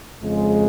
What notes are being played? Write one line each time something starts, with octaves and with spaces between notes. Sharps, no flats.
F2 C#3 G#3